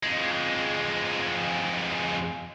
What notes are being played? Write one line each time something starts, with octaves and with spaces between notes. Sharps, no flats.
F2 G#3